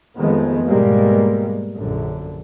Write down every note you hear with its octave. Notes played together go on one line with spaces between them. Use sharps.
F2 D#3 F3 G#3 A3 B3
G#2 B2 G3 G#3 A#3
A#1 F#2 D3